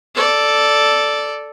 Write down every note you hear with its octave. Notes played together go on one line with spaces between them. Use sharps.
A4 D5